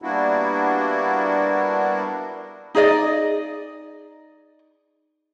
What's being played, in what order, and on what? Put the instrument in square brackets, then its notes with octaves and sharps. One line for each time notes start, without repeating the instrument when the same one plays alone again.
[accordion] G3 A#3 B3 D4 E4 F#4
[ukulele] D#4 G#4 D5 D#5